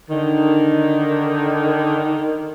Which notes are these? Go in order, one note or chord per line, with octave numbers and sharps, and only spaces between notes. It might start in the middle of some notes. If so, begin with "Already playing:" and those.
D3 D#3